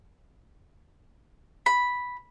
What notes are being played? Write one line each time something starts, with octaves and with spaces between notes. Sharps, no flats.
B5